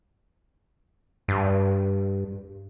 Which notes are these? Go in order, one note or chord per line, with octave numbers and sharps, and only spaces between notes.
G2